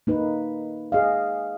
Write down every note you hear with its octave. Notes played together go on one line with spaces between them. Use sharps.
A#3 D#4 B4
G#4 D#5 F5